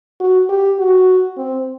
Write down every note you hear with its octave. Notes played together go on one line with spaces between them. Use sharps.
F#4
G4
F#4
C4